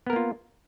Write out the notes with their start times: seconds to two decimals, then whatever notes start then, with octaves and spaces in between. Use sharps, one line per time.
0.07 B3
0.10 A#4
0.13 A#3
0.16 F4